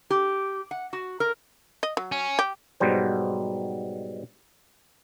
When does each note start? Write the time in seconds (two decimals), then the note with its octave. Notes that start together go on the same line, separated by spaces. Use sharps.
0.10 G4
0.71 F#5
0.93 F#4
1.20 A#4
1.83 D#5
1.97 F#3
2.12 C#4
2.39 G4
2.80 G#2 B2 F#3 G3 C5